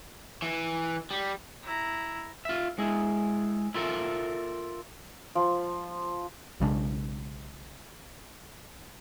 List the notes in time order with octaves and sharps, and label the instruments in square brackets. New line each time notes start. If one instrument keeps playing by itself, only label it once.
[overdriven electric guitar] E3
G3
[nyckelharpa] E4 A#5
[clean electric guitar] F4 E5
G#3 E4
E4 F4 A4 A#4 E5
[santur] F3
[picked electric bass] B1 C#3 G#3 D4